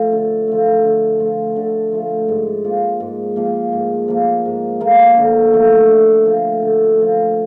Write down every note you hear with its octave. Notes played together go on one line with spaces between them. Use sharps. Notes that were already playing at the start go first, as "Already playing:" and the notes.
Already playing: F3 A3
D3
F3 A3
D3
F3 A3
D3
F3 A3
G#2
F3 A#3
G#2
F3 A#3
G#2
F3 A#3
G#2
F3 A#3
D3
F3 A3
D3
F3 A3
D3
F3 A3